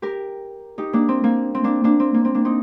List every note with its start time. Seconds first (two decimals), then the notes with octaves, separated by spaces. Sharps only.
0.02 G4 A#4
0.78 D#4 G4
0.93 A#3 D4
1.09 C4
1.24 A#3
1.55 C4
1.64 A#3 D4
1.84 A#3 D4
2.00 C4
2.14 A#3
2.25 C4
2.34 A#3 D4
2.45 C4 D#4